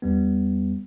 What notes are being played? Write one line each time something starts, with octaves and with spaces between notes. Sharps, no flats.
E2 G3 B3